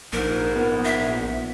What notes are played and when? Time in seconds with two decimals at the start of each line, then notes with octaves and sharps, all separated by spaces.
0.13 A#1 G#2 A#4
0.56 B3
0.84 E5